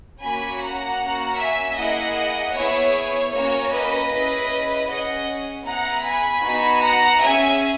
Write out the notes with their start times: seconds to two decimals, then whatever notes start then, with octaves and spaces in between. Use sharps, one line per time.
0.21 A#3 C#4 F#4 G#5 B5
0.60 F#5 A#5
1.00 A#3 C#4 F#4
1.38 E5 G#5
1.77 A#3 E4 G#4 D#5 F#5
2.55 B3 E4 G#4 C#5
3.33 A#3 C#4 F#4 C#5
3.71 B4 D#5
4.11 C#4 E4 G#4
4.88 C#4 G#4 D#5 F#5
5.65 B3 E4 G#4 F#5 A#5
6.04 G#5 B5
6.43 B3 D#4 F#4
6.81 F#5 A#5
7.21 C#4 G#4 E5 G#5